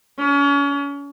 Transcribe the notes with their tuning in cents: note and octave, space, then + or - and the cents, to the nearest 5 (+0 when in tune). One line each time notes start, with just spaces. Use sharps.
C#4 +35